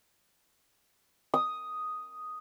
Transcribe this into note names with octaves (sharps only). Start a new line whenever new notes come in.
D#6